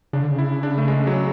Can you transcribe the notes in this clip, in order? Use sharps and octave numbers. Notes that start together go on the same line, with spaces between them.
C#3 D4
D3
C#3
E4
D4
A3
G#3
F#3